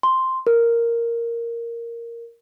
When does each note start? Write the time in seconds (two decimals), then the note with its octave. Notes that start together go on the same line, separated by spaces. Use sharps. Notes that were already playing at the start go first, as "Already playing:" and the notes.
0.03 C6
0.47 A#4